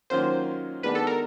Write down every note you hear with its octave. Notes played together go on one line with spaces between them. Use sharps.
D#3 F#3 A#3 C#4 F4 C5
D#3 G#3 B3 D4 F#4 B4
A4
A#4